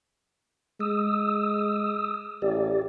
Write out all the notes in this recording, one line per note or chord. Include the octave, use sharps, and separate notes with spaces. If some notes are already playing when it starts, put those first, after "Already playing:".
G#3 D#6 E6
A1 G4 D5